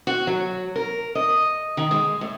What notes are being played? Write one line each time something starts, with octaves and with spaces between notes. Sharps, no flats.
F#4
F#3
A#4
D#5
D#3
G#3
A2